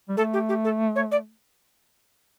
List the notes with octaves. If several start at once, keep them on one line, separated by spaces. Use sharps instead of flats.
G3
A3 A4
G4
G4
A4
C#5
D5